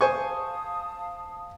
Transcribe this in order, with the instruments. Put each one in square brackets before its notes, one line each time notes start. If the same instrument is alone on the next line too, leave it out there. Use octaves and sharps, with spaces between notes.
[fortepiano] C5 G#5 C#6 [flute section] F5 A5 D#6